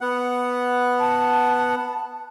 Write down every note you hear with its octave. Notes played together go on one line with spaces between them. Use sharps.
B3 F#5
A5